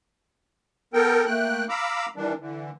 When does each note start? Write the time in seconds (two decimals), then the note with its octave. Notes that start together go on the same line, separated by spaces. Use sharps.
0.94 B3 A4 A#4 G5
1.26 A3 A#3 G5 F#6
1.69 F5 A#5 B5 D6 E6
2.16 D#3 E3 G3 D4
2.39 D3 E3